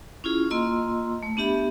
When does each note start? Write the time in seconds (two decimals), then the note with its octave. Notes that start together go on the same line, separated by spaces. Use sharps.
0.24 C#4 E4 F4 G#4
0.50 A#3 F4 D#5 C6 E6
1.23 A3
1.37 B3 D4 G4 E5 B5